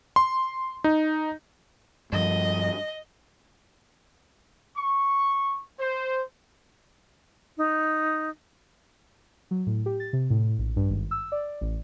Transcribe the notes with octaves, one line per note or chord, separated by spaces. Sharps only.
C6
D#4
G2 F3 D#5
C#6
C5
D#4
F#3
A2
G4
A6
C3
A2
A#1
G2
G#1
E6
D5
A1